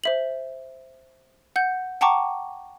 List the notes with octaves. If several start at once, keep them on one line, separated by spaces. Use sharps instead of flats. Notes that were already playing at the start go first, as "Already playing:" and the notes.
C5 E5 F#7
F#5 G6
F#5 G5 A5 A#5 C#6 D6